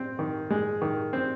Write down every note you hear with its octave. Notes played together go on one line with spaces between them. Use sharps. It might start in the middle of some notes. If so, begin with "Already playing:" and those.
Already playing: C4
D#3
G#3
D#3
C4